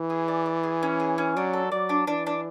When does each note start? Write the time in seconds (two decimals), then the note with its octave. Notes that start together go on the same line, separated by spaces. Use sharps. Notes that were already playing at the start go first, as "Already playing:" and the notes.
Already playing: E3
0.10 G#4
0.28 D5
0.46 D5
0.63 G#4
0.83 C#4
1.00 G#4
1.18 C#4
1.36 F#3 D4
1.53 A4
1.72 F#3 D5
1.89 D4
2.07 E3 D4
2.27 D4